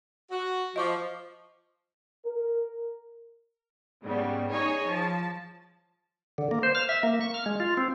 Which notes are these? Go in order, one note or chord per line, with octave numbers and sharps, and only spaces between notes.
F#4
F3 D#5 C#6 D6
A#4
G#2 C#3 G3 B3
D#4 G#4 C#5 G#5
F3 A5
D3
A#3
C5
F6
E5
A#3
C#6
F6
G#3
F4
C4